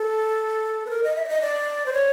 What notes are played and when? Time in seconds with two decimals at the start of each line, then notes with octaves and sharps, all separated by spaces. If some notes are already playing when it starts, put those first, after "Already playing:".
Already playing: A4
0.86 B4
0.90 A#4
1.04 D#5
1.16 E5
1.25 D5
1.29 D#5
1.42 D5
1.86 C5
1.93 C#5